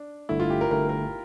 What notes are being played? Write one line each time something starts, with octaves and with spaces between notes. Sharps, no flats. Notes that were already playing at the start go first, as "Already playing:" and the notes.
Already playing: D4
G1 G2 D3 A3 E4
F4
G4
A#4
G1 G2 D3 A3 A#4
A#4